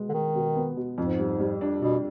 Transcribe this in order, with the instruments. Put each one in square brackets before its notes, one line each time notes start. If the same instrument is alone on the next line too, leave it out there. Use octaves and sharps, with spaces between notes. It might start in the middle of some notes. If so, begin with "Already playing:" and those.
Already playing: [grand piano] B2 G#3 B3
[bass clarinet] D3
[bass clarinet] D#3 [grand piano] G#3
[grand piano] B2
B3
B2
[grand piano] F2 [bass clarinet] G#2
[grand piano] G3
G3
D4
[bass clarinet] B2 [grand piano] D4